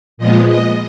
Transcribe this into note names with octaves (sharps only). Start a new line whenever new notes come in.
A#2 F3 G#3 B3 D#5
D#5